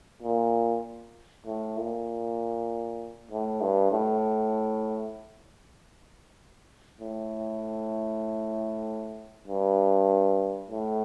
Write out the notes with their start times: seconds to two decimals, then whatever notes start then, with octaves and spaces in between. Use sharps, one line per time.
0.22 A#2
1.46 A2
1.77 A#2
3.31 A2
3.61 G2
3.92 A2
7.00 A2
9.47 G2
10.71 A2